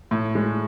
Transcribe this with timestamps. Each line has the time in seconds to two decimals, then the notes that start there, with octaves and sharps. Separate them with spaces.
0.11 A2
0.35 G#3